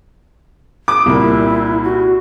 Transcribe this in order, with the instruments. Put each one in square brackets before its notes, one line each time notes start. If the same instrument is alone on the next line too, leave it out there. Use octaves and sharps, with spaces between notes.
[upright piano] D6 D#6 D7
[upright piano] C2 A#2 [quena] E4
[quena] F#4